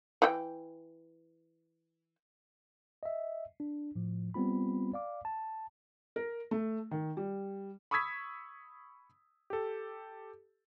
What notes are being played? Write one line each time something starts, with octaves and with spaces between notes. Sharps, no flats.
E3 F#4 G5
D#5 E5
D4
A2 F3
G3 B3 C4 F4 B5
D5 F5 D6
A5
A#4
A3
D#3
G3
B5 C#6 D#6 E6 G#6 B6
G4 A4